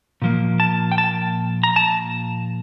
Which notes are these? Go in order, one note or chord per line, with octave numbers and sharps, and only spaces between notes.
A#2 F3 A#3
A5
G5
A5
A#5
A5